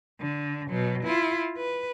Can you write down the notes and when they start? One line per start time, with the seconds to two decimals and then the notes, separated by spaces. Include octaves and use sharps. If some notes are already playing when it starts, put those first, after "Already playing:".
0.20 D3
0.69 B2 F#3
1.04 E4 F4
1.57 B4